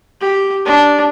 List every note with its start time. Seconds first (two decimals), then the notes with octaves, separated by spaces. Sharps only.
0.21 G4
0.66 D4